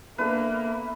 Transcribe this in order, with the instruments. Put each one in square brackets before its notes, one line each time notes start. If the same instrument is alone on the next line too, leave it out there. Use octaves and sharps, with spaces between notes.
[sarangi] A#3 [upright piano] B3 D4 A4 [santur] B4 [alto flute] E5